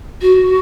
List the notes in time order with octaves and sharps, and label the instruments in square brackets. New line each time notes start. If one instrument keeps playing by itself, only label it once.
[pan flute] F#4